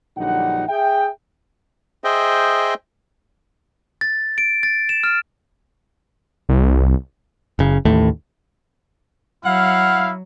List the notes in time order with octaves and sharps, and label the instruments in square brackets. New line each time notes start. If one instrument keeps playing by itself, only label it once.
[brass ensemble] A#1 D3 F#3 G3 D#4 F#5
G#4 E5 G5
[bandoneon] G#4 C5 D#5 E5 G5
[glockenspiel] A6
D7
A6
E7
F6
[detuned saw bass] C2
[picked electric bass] F#1 C#3
A1 D#2 A2 A3
[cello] F#3 [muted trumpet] E4 [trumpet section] F5 [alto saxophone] F#5